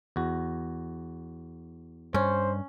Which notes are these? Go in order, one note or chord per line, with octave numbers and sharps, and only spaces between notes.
E2 F#4
G2 C#4 C5